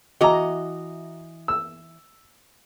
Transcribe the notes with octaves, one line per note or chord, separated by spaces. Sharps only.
E3 F#4 D#5 A#5
E6